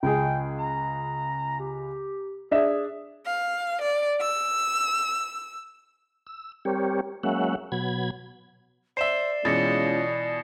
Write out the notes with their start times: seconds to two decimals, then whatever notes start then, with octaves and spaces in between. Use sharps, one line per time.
0.03 C#2 G#4 G5
0.58 A#5
1.59 G4
2.51 D4 G#4 E5
3.26 F5
3.83 D5
4.21 E6
6.27 E6
6.65 G3 C4 G4 A#4 C#5
7.23 F#3 G#3 A#3 C#4 E5 F#5
7.72 B2 F#3 B5 G#6
8.97 C5 D5 E5 C7 E7 G7
9.45 B2 E3 G#3 C#4 F4 A6 A#6 C#7